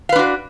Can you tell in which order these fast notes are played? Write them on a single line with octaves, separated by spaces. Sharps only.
F5 B4 D4 F#4